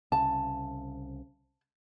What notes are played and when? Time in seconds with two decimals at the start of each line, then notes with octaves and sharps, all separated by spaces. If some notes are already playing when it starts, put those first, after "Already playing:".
0.12 C2 C#3 A5